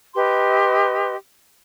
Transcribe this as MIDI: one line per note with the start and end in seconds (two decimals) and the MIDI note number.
0.15 1.15 67
0.15 1.15 71
0.15 1.15 75
0.15 1.15 84